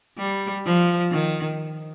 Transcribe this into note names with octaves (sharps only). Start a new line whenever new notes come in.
G3
F3
D#3